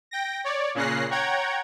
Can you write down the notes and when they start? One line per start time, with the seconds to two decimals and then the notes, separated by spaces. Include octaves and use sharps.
0.11 G5 A#6
0.44 C#5 D5
0.75 A#2 C#3 C#4 F#6 A#6 C7
1.11 C#5 F#5 G5 A#5 G#6